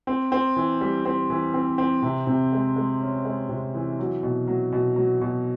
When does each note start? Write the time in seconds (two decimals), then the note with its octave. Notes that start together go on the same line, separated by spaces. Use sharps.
0.07 C4
0.32 C4
0.56 E3
0.81 G3
1.05 C4
1.30 E3
1.54 C4
1.78 C4
2.02 C3
2.27 C3
2.52 G#3
2.76 G#3
3.01 C#4
3.25 G#3
3.49 C3
3.74 E3
3.99 F#3
4.23 B2
4.48 F#3
4.72 B2
4.96 F#3
5.21 B2